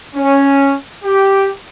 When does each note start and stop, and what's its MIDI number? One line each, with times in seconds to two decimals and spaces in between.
0.16 0.75 61
1.04 1.50 67